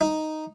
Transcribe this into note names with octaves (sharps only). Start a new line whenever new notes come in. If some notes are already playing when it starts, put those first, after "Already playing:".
D#4